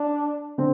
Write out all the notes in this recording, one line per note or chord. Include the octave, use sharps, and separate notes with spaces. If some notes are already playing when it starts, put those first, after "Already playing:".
Already playing: D4
D3 C4